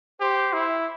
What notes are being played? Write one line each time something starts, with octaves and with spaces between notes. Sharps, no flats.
G4 C5
E4